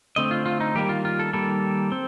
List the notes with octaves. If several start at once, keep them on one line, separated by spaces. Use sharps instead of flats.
D3 A3 C4 D#5
F4
F4
D#4
D#3 G3 A#3 G4
F4
F4
A4
D#3 G3 A#3 A4
C4